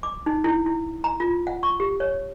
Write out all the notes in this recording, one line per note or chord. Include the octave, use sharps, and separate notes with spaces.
D6
D#4
E4
E4
A#5
F4
F#5
C#6
G4
C#5